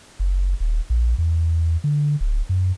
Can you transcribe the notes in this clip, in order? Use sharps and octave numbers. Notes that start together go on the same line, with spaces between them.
F#1
D#1
A#1
E2
D3
D1
F#2